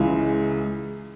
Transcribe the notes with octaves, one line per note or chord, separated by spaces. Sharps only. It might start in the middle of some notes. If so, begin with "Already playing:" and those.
Already playing: C#2 C#3 E3 G#3